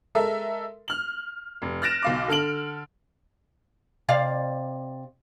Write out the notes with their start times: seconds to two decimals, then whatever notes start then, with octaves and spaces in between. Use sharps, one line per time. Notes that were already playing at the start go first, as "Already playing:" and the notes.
0.15 G#3 A4 A#4 E5
0.88 F6 F#7
1.62 F1
1.82 F6 F#6 A6 A#6 D7 E7
2.02 B1 F5 D6
2.28 D3 A4 F6 D7 F#7
4.09 C3 D5 F5